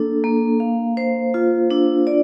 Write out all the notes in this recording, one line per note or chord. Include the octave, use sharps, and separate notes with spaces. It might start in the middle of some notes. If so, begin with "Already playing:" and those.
Already playing: A#3 D4 A4
A#3
F5
C5
F4
D4
D5